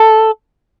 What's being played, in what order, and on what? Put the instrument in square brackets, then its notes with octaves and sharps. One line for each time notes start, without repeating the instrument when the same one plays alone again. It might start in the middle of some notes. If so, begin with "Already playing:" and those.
Already playing: [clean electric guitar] A4